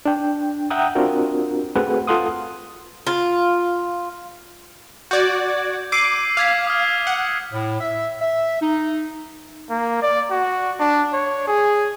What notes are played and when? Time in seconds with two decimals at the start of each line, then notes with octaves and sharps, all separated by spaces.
0.06 D4 G5
0.70 E5 F#5 G5 A#5 D#6
0.95 C4 D4 F4 F#4 A#4
1.76 A3 C4 F#4 G#4 B4 F#5
2.07 F4 A4 F#5 C6 D#6
3.07 F4
5.11 F#4 D5 G6 G#6
5.92 D6 E6 C7 D#7
6.37 F5 D6 G#6 B6
6.67 D#6 F6
7.07 F#5
7.52 A2
7.81 E5
8.21 E5
8.61 D#4
9.70 A#3
10.02 D5
10.31 F#4
10.80 D4
11.13 C#5
11.47 G#4